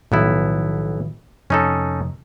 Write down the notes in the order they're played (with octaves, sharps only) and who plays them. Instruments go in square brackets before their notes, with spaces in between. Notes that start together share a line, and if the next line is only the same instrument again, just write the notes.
[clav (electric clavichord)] B1 B3 E4 [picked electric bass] A2 D#3 F3
[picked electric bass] F2 C3 F3 [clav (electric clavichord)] C#4 D#4 A4